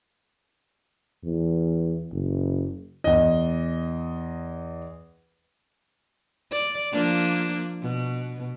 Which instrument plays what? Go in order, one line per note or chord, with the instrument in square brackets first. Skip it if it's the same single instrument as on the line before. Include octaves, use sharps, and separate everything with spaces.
[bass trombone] E2
F#1
[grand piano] E2 D#5
[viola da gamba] D5
F3 A#3 D4
B2